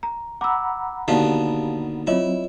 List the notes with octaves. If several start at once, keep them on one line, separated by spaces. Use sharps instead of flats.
A#5
F#5 A#5 B5 D6 E6
D#2 B2 D3 G4 F5 A5
F#3 C4 E4 F4 C#5 D#5